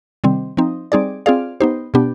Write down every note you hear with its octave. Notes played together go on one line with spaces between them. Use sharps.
C3 D#3 G3 C4
F3 C4 D#4
G3 C4 D#4 G#4 D5
C4 F4 G#4 D5 F5
B3 D#4 G4 C5
B2 B3 D4 G4